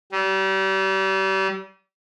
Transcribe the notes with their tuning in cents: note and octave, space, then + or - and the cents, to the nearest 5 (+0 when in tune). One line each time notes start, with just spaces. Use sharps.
G3 -35